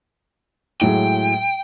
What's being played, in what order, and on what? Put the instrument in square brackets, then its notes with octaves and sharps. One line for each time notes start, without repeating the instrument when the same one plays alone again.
[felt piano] A2 F#3 G#3 [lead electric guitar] G5